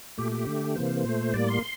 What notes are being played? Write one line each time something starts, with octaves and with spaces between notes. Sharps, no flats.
A#2 A3 G4
G4
D3 A3
C3 E3 A#3 C5
A#2 A3
A2 G3 A#3 D5
C6